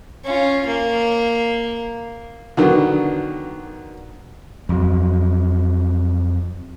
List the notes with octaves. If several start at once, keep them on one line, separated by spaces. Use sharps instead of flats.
C#4 F4
A#3
D3 D#3 F#3 B3
F2 F#3